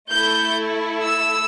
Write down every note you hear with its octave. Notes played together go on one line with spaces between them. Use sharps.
A3 E4 A4 G6
E6